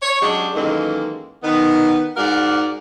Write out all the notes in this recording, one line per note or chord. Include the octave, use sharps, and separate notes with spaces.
C#5
F#3 G#3 C#4 D4 G4 G#4
F#2 D#3 E3 G#3 A#3 A4
D#3 B3
G#2 F#4 A#4 D5 F5 F#5